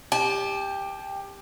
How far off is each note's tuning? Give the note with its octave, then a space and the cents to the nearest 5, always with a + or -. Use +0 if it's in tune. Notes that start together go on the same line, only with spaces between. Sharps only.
G4 +15 A5 -30